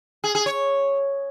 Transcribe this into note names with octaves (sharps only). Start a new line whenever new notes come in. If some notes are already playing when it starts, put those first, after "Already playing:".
G#4
G#4
C#5